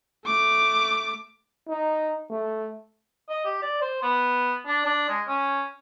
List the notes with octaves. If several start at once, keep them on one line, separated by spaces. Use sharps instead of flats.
A3 D6
D#4
A3
D#5
G4
D5
C5
B3
D4
D4
G#3
C#4